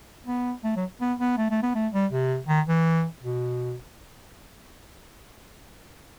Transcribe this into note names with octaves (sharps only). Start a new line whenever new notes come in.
B3
A3
F#3
B3
B3
A3
A3
B3
A3
G3
C3
D#3
E3
B2